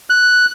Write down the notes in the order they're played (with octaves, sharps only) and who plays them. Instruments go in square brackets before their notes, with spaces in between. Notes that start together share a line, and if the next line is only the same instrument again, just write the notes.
[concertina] F#6